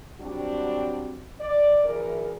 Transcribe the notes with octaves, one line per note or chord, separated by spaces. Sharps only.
F#3 G3 C4 D4 F#4
D5
D2 E3 G#4 A#4